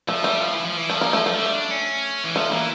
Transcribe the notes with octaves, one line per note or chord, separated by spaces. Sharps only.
F3 A3
G3 A3
F3
E3
F3
E3
F3 A3
A#3
A3
F3 A3
G3
D4
C#4
E3
F3 A3
E3 A#3